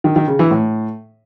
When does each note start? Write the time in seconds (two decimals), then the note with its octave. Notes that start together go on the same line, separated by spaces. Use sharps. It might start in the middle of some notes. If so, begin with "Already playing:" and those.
0.04 D#3
0.16 D#3
0.28 C#3
0.39 E3
0.51 A2